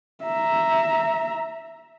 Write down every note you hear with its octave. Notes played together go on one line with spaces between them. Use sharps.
E5 A#5